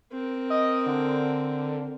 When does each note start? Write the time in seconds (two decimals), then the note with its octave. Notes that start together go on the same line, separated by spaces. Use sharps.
0.12 C4 A#4
0.50 D#5
0.86 D3